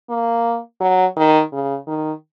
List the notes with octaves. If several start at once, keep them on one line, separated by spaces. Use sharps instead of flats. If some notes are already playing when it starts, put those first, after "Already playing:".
A#3
F#3
D#3
C#3
D#3